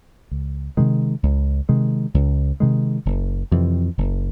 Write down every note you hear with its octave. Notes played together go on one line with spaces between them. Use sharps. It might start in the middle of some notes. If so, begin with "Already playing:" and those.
C#2
C3 D#3 G#3
C#2
C3 D#3 G#3
C#2
C3 D#3 G#3
F#1
F2 C3 E3
F#1